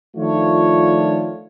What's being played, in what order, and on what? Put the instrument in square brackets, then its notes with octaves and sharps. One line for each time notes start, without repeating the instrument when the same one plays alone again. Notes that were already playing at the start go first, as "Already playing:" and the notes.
[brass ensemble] D#3 F3 A3 D4 F4 C#5